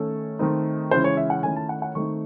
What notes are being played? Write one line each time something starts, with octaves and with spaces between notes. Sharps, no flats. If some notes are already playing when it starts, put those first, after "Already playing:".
Already playing: D#3 A3 C#4 A4
D#3 A3 C4 D#4
C#3 E3 G#3 C#4 E4 C5
C#5
E5
F#5
D#3 A3 C#4 E4 G#5
A5
F#5
F#5
D#3 A3 C4 D#4 C#6